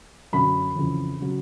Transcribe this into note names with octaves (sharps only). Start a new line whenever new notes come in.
F#2 D3 F#3 B5
F2 C#3 E3
C#3 F#3